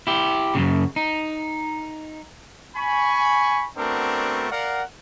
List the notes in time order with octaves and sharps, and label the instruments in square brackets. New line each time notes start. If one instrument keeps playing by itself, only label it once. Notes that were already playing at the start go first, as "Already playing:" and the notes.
[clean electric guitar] E4 G4
F#2 A#2 C#3
D#4
[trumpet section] G#5 B5 C#6
A3 B3 C4 D4 F#4 A#4
A#4 D5 F5 F#5